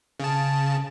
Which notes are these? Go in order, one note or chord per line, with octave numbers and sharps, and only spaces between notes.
C#3 A5